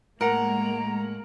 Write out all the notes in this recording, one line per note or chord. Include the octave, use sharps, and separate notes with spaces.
A2 G#3 A#3 A#4 F#5 A#5